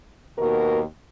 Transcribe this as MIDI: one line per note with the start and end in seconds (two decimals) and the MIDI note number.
0.39 0.81 39
0.39 0.81 47
0.39 0.81 66
0.39 0.81 70